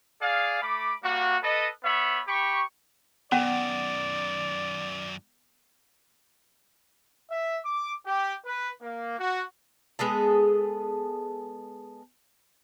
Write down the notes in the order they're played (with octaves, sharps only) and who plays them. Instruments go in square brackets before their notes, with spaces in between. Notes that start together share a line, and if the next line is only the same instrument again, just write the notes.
[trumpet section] G#4 D5 F5
A3 B5 D6
G3 A#3 F#4
A4 B4 D#5
B3 C#5 E5 B5
G4 B5 C#6
[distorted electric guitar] F#2 D#3 [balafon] B3 [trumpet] D5 [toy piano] F#5
[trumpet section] E5
D6
G4
B4
A#3
F#4
[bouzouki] G#3 B3 G#4 A4